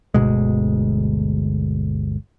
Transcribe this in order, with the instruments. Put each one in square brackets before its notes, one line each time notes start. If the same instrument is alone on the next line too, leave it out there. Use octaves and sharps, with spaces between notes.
[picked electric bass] G1 D2 B2 G#3